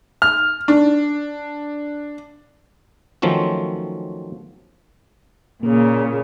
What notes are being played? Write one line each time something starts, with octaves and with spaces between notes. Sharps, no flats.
F6
D4
D#3 F3 F#3 A3 C4 C#4
A#2 C#3 A#3